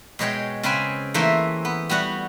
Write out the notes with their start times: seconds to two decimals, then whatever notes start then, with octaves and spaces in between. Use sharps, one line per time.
0.19 B2 G#3 C#5 G5
0.63 C#3 C4 B4 C5 G#5
1.14 E3 A3 A#3 C5 E5
1.65 B3
1.89 G3 B3 F#4 F#5